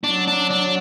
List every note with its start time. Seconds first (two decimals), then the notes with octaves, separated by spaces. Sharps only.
0.03 F#3 D4
0.27 D4
0.50 D4